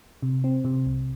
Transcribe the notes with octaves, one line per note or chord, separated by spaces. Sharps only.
C3
C4
C3
C2